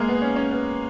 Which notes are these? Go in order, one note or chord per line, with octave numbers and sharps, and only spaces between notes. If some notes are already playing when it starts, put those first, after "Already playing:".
Already playing: G#3 A#3
B3
C#4
C#4
B3